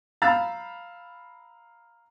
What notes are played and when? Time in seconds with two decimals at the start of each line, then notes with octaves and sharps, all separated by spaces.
0.22 F5 A#5 B5 E6 A6